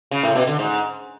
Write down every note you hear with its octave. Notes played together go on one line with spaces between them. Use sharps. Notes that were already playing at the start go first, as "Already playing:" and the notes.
C#3
A2
B2
D3
G#2